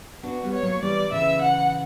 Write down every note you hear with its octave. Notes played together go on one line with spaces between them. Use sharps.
B3 D4 F#4
G3 B3
C#5
F#3 A#3
E3 G3 D5
C#3 E3 E5
F#5